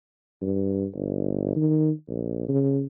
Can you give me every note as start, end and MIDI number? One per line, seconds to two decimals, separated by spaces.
0.42 0.85 43
0.95 1.55 31
1.56 1.91 51
2.09 2.46 34
2.48 2.85 49